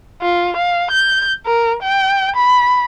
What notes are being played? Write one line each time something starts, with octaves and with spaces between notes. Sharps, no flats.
F4
F5
G6
A#4
G5
B5